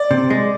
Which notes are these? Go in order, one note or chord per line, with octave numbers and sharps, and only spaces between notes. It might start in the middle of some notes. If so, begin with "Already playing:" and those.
Already playing: D5
C3
G#3